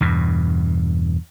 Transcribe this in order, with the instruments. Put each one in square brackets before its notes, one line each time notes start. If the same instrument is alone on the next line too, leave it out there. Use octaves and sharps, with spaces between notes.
[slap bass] E2 G2 B2